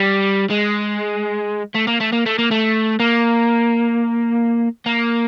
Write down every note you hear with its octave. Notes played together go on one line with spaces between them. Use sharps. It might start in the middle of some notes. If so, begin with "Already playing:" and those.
Already playing: G3
G#3
A3
A#3
A3
A#3
A3
A#3
A3
A#3
A#3